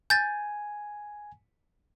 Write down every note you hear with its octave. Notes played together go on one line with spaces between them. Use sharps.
G#5 G6 A6